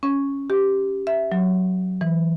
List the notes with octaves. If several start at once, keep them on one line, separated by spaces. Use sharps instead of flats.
C#4
G4
E5
F#3
E3